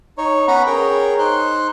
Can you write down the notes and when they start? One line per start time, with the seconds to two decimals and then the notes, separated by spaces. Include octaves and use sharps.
0.18 D#4 C#5
0.48 B3 C#4 F#5 A#5 B5
0.66 G#4 A#4 C#5 G5
1.19 D#4 C5 F#6